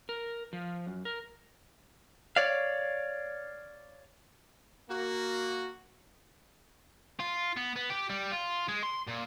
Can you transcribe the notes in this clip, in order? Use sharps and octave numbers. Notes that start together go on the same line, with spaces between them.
A#4
F3
F#2
A#4
C#5 D5 F5
A#3 F#4
F4
B3
B3
G4
G3
F4
G#3
C6
A#2